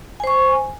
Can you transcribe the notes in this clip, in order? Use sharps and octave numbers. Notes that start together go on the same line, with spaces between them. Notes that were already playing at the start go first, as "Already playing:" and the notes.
C5 G#5 C#6